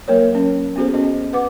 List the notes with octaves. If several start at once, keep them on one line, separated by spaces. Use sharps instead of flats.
F#3 A#3 A#4 C#5
C#4
B3 C#4 F#4 G#4 A4 C5
C#4 D#5
B4 F#5 D6